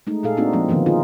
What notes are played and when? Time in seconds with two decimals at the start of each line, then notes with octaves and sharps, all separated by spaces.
0.07 G#3 A3 D#4
0.23 A#2 G#4 A4 F5
0.37 A#3 C4 D4 D#4 F#4
0.53 F3 G#3 A#3 C4
0.69 D3 D#3 F3 A#3 B3
0.86 D#4 F4 G#4